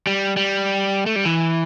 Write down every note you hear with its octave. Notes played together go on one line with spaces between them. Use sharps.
G3
G3
A3
G3
E3